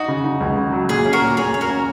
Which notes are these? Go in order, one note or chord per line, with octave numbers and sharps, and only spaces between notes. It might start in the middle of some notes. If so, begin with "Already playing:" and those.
Already playing: D#4 F#4
C#3
D#4
C#2
C#3
F#3
A#2 G#4
C#4
F#4 A#4
A#2
A#2 G#4 C#5
C#4 C#5
F#4 A#4
C#4